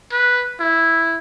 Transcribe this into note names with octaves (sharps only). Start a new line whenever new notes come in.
B4
E4